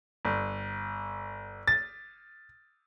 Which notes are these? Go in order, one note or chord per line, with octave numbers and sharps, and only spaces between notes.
G1
A6